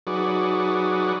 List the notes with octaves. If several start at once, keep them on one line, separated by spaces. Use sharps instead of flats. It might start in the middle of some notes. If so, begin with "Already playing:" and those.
F#3 D#4 F#4 G#4 B4 D5